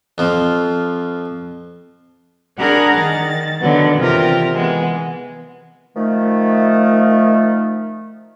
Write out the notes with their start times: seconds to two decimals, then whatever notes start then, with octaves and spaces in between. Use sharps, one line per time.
0.18 F2 F3
2.58 D4 G#4 A#4 F#5 A#5 B5
2.94 D#3 A6
3.60 D3 D#3 F#3 B3
3.99 C3 E3 F4 G4 A#4
4.54 E3 G#3 B3
5.95 D#3 F3 A3